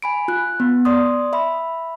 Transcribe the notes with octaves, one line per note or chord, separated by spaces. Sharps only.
G#5 B5 D7
F4 F#6
B3
D5 C6 D#6
E5 B5